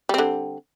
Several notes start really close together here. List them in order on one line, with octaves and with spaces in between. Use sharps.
G3 C4 D3